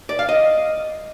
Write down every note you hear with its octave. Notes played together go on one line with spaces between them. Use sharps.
D5
F5
D#5